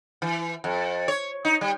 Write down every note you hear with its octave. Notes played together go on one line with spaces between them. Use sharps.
E3
F2
C#5
D#4
G3